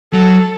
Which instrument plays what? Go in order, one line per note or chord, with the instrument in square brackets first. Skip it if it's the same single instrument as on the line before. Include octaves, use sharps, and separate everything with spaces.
[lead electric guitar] F#3 [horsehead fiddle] A4